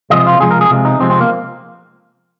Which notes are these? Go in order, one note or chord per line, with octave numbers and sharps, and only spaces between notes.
C3 F3 G#3 D#5
F4
C3 F3 G#3 G#4
A#4
G#4
C3 F3 G#3
D#4
C3 F3 G#3 C4
C4
A#3